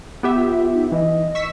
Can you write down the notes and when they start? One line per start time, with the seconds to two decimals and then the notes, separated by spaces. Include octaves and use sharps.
0.23 B3 G4 E5
0.36 F4
0.74 D#4
0.92 E3 D#5
1.35 C#6 E6 B6